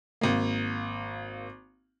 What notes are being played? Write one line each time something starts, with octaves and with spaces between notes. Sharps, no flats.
G#1 A#3